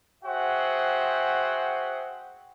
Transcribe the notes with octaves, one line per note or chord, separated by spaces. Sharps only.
F#4 G#4 C5 E5 F#5 G5